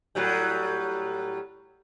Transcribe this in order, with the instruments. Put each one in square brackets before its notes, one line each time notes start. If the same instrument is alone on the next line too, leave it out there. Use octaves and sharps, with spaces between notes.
[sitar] A2 F#3 G3